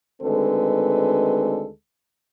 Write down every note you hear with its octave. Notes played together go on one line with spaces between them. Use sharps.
D2 D#3 G#3 C4 A4 B4